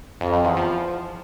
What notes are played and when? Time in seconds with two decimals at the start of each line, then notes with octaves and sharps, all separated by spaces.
0.21 F2
0.33 F2
0.45 E2
0.57 F3